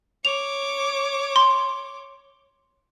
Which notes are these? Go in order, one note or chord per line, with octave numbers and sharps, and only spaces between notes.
C#5 D6 F7
C6